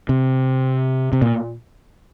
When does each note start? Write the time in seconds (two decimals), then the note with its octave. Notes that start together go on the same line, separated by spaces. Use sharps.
0.09 C3
1.13 C3
1.22 A#2